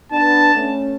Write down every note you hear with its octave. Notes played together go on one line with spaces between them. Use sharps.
B3 D4 A5
A3 C#4